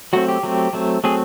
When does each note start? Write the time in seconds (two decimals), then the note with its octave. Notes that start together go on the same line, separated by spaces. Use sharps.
0.13 F#3 A3 C4 F#4
0.29 G4
0.43 F#3 A3 C4
0.73 F#3 A3 C4
1.04 F#3 A3 C4 G#4